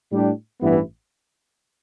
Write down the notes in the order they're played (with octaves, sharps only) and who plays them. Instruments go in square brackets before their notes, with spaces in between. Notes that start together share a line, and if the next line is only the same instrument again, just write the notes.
[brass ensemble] A2 G3 D4 G4
A1 G2 E3 B3 E4